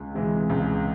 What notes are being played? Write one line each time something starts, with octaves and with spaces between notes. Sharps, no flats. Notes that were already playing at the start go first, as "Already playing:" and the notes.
Already playing: C#2
C3 E3 G#3
C#2